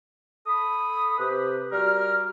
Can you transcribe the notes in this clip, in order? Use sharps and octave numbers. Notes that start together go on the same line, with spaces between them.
A4 B5 D#6
C3 G4 B4
G3 F#4 A#4 F6